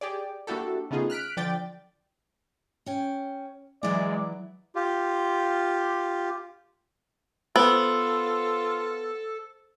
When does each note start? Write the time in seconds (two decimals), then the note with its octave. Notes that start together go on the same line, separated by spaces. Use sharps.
0.01 G4 G#4 D5
0.47 A#3 D4 E4 F#4 G4 A4
0.91 C#3 A3 B3 D#4 F4 G#4
1.10 F6 F#6 B6 D7
1.37 D3 F3 D5 G5 A6
2.86 C#4 G5
3.83 E3 F#3 G#3 E4 D5
4.75 F4 G4
7.56 B3 F4 A4 C5 E6